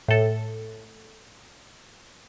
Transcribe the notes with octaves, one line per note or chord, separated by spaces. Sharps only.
A2 A4